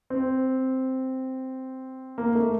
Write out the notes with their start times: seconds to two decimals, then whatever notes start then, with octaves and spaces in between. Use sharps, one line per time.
0.10 C4
2.18 A#3
2.35 A3